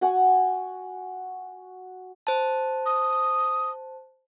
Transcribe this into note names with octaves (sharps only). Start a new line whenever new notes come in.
F#4 F#5 G#5
C5 A5
D#6